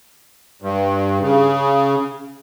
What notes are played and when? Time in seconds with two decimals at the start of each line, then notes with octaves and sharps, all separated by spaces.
0.62 G2
1.22 C#3